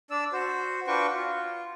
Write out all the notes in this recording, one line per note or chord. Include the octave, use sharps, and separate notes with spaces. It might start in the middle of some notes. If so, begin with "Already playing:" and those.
D4 D5 E6
F#4 C5
D4 F4 F#4 B4 G5 C#6
F4